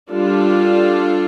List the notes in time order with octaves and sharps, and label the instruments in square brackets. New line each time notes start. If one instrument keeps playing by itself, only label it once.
[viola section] G3 D4 F4 A4